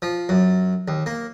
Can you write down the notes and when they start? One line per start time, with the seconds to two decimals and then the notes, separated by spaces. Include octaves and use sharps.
0.02 F3
0.29 F#2
0.88 D#2
1.06 A#3